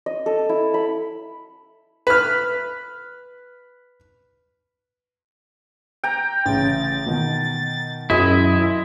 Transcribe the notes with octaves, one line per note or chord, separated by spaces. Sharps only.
D#5
A4
E4
B5
B4 F6
G5 A#5
A1 C#3 A6
B2 D#3
F#2 G#3 E4 D#5 B5